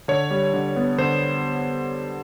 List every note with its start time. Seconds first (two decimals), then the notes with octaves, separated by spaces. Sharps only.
0.08 D3 C#5
0.31 G3
0.53 D3
0.76 B3
0.98 D3 C5